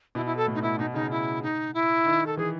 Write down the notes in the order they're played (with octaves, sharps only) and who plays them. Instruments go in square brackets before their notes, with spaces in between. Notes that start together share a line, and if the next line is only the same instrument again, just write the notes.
[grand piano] B2 [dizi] E4
[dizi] E4
A4
[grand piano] A2
[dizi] D#4
[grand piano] B2 [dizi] E4
[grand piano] B2 [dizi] D#4
[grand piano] C#3 [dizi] D#4
[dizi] E4
D#4
E4
[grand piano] D#3
[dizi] A4
[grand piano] E3 [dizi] G#4